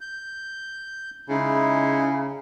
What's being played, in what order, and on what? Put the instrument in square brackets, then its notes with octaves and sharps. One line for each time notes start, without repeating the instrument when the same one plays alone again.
[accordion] G6
[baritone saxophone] C#3 [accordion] G#3 D#4 E4